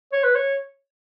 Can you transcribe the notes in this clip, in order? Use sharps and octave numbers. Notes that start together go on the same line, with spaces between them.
C#5
B4
C#5